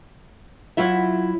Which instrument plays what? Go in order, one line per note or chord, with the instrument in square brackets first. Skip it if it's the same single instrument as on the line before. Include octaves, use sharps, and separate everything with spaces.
[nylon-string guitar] F#3 E4 F4 E5